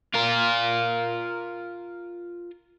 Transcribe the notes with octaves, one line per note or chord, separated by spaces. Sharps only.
F4 A#4